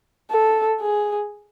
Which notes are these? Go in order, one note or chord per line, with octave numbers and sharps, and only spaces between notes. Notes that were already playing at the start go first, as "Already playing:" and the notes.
A4
G#4